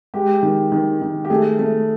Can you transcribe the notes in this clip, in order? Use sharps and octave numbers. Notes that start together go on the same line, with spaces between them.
G#3 G4
D#3
D#3
D#3
G4
A3 G#4
A3